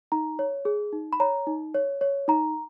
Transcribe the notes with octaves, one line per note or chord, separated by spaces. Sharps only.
D#4 A#5
C#5
G#4
D#4
B5
C#5 A#5
D#4
C#5
C#5
D#4 A#5